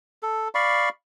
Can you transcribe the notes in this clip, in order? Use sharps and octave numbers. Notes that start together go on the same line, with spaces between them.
A4
D5 F5 B5 C#6